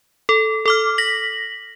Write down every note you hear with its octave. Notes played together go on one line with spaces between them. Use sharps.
A4
A4 D6 F6
A#6 B6 F#7